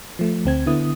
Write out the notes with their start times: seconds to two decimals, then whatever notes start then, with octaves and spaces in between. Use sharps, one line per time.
0.19 F3 A3
0.45 D2 C4 G#6
0.66 D3 B3 E4 D#6